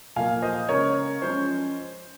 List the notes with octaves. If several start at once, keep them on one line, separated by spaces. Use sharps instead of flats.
A#2 F3 A#3 F5 G#5
C5 D#5
C#3 G#3 C#4 A#4 C#5
F3 G#3 C#4 C5